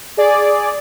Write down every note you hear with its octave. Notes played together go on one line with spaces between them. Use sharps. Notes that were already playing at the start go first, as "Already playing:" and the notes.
G#4 D5